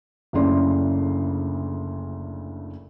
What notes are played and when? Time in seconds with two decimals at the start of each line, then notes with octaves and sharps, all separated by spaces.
0.33 F#1 D2 C#3 E4 D5 C6